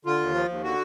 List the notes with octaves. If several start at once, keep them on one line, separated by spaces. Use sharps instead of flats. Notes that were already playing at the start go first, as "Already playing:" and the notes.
D3 F4
D#2
F3
D#2
D3 F#4